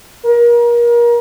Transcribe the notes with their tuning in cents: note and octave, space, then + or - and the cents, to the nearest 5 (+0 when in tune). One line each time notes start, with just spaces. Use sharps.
A#4 +30